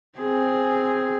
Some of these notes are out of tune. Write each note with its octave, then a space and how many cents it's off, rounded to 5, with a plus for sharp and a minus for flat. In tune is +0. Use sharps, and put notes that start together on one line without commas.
C4 +0 G#4 +0